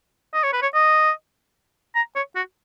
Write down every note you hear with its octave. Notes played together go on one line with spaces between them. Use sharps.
D#5
C#5
B4
C#5
D#5
A#5
C#5
F#4